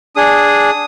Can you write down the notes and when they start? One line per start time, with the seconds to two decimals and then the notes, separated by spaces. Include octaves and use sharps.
0.16 D4 G#4 D#6